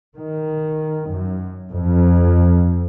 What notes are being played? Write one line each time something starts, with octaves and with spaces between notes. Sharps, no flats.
D#3
F#2
F2